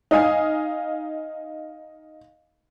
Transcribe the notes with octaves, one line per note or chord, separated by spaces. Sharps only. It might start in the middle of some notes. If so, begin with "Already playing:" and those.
D#4 D#5 F5 G#5